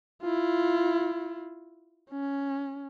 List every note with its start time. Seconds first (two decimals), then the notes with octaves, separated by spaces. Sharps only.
0.22 E4 F4
2.11 C#4